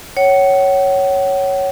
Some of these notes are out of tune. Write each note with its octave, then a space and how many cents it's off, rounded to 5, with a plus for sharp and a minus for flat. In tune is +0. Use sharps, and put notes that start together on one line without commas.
C#5 +0 F#5 +40